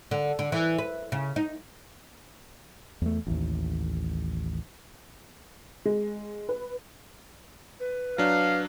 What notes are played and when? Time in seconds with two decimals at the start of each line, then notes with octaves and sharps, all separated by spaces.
0.11 D3
0.39 D3
0.52 E3
0.78 B4
1.12 C#3
1.36 D#4
3.02 E2 A3
3.27 A1 D#2
5.85 G#3
6.49 B4
7.79 B4
8.18 F#3 D4 F5